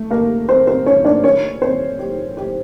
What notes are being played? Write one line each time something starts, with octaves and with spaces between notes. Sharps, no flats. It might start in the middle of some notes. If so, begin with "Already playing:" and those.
Already playing: A3
A#3 A#4
C4 C5
C4 C5
C#4 C#5
D4 D5
C#4 C#5
C4 C5
G4
G4